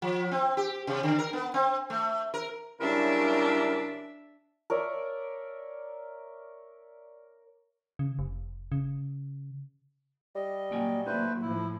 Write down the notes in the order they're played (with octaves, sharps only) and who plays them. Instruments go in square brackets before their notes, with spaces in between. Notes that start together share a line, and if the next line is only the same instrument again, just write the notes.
[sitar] F3
C4
G4
C3
D3
A#4
B3
C4
A3
A#4
[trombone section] C#3 F#3 G3 [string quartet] D4 [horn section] E4 A#4 [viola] E5
[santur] A#4 C#5 D5 E5
[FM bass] C#3
F1
C#3
[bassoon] G3 [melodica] D#5
[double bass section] A#2 F#3 [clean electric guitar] A#3 G5 G#5
[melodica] A3 B4 C5 [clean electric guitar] A#3 D#4
[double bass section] A2 F3 [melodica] E4